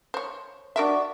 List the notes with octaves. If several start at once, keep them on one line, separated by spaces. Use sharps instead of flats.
C5 C#5
D4 F#4 A#4 D5 E5